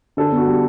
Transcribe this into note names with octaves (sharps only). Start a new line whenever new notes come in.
D3 A4
B3
F#4
G3